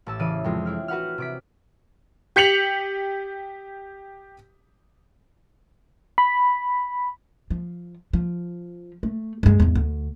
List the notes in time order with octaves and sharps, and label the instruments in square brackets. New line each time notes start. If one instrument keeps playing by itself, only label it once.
[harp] A1 A5 E6
C#3 E3 D5 D#7
F2 C3 G#3
D4 E4 F6
F#4 B4 F#5 F6
C3 D6 B6
[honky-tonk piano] G4 G6 B6 C#7 F7 F#7
[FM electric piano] B5
[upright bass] F3
F3
A3
G2 G#3
E2 G#2
D2